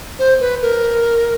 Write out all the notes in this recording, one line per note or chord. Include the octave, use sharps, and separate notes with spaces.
C5
B4
A#4